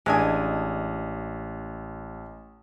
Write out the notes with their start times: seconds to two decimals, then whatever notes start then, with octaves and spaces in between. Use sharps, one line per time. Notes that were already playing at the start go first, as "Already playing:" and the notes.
0.06 A1 G#3 D4 G#5 D#6